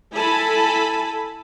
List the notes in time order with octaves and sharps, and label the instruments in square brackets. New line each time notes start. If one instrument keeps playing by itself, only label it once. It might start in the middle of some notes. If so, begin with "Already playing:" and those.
[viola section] E4 A4 G#5 A5 B5